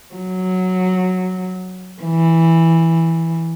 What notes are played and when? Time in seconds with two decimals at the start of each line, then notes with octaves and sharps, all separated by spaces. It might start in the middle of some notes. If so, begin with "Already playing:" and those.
0.15 F#3
2.03 E3